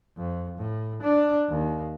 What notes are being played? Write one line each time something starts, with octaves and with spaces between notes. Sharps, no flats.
F2
A2
D4
D#2